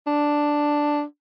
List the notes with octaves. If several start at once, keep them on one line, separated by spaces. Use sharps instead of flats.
D4